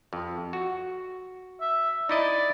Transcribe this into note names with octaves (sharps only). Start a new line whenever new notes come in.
F2
F#4
E5
D#4 E4 D5 D#5